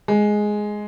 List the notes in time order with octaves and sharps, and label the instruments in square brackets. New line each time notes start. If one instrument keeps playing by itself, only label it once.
[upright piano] G#3